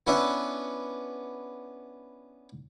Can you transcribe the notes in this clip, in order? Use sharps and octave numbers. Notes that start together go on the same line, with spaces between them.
B3 C#4 D4 E4 B4 E5